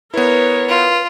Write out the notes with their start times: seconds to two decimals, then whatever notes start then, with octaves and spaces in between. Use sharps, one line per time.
0.14 B3 E4 A#4 B4 C#5
0.69 F4